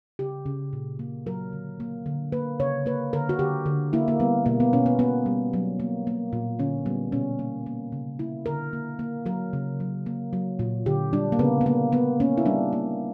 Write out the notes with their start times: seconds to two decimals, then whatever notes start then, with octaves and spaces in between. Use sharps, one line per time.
0.19 C#3 G4
0.46 C#3
0.73 A#2
0.99 A#3
1.26 F#3 A#4
1.53 D3
1.80 A#3
2.06 D3
2.32 A#3 B4
2.60 C#3 C#5
2.86 A#3 B4
3.13 D3 A#4
3.29 F#4
3.39 D3 G4
3.66 D3
3.93 A#3 E4
4.08 A#3
4.20 G3 B3
4.46 B2 A#3
4.60 B3
4.73 B2 C#4
4.86 B3
4.99 A#3 B3
5.26 G3
5.53 F#3
5.80 A#3
6.07 A#3
6.33 A#2
6.59 D3 C#4
6.86 G3 B3
7.12 B2 C#4
7.39 A#3
7.66 A#3
7.92 C#3
8.19 A#3 E4
8.46 D3 A#4
8.73 A#3
8.99 A#3
9.26 F#3 A#4
9.53 C#3
9.80 F#3
10.06 A#3
10.33 F#3
10.59 A#2
10.86 D3 G4
11.13 G3 D4
11.32 A#3
11.39 C#3 B3
11.61 B3
11.66 A#3
11.92 A#3 B3
12.20 A#3 C#4
12.37 E4
12.46 G3 D4
12.73 A#3